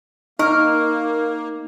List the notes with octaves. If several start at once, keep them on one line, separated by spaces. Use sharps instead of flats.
A#3 D#4 A#4 C#6 F6